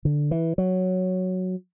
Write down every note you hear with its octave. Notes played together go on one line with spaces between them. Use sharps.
D3
E3
F#3